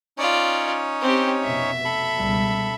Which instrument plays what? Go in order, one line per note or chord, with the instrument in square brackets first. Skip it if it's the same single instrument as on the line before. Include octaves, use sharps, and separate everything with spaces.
[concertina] C#4 D#4 C#5 [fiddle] F4 D5
[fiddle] C4 G4
[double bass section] F1 B2 [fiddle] E5
[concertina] A4 B5
[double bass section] C#2 B2 G3